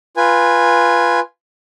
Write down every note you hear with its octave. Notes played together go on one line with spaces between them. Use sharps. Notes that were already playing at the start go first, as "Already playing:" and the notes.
F4 B4 G#5